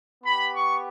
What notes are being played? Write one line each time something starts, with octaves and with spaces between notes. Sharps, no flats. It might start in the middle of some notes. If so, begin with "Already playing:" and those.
B3 G4 B5
C#6